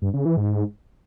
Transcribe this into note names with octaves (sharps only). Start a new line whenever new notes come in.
G2
C#3
E3
G#2